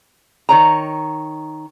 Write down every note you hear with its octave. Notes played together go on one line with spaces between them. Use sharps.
D#3 C#5 A#5